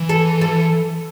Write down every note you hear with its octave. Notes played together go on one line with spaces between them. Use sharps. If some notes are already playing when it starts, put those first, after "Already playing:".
Already playing: E3
A4
A4